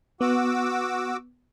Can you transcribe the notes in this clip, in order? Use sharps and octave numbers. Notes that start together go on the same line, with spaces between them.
B3 F#4 D6 E6